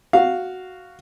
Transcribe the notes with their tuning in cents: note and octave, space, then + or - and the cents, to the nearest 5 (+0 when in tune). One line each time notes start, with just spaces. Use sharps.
F#4 +0 F5 +0